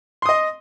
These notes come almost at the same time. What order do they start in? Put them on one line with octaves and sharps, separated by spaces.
C6 D#6 D#5